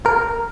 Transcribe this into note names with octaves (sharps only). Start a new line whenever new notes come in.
A#4